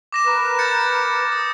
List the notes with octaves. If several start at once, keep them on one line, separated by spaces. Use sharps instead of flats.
D6 A#6 E7
A#4 B4
G6 A6 C#7
D#6